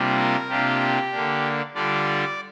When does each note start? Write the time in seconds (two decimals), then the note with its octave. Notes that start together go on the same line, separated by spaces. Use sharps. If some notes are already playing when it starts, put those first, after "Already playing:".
Already playing: C3 G3 A#3 D4 F4
0.17 A#4
0.48 C3 A#3 D4 F4 G4
1.12 D3 A#3 D4
1.74 D3 G3 D4 F4 D5